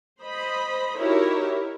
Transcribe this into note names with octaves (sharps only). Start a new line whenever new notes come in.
C5 D#5 B5
D#4 E4 F#4 G4 A#4 C#5